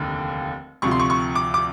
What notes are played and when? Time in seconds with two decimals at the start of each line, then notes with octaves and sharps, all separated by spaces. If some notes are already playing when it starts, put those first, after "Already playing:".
Already playing: F1 D#2 D3
0.82 D2 C3 F3 C#6
0.91 C6
1.00 C#6
1.10 C#6
1.35 D6
1.54 D6